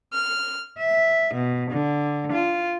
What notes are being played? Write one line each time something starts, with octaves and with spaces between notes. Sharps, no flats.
F6
E5
B2
D3
F4